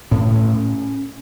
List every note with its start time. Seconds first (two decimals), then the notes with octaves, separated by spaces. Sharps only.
0.11 A2 C#4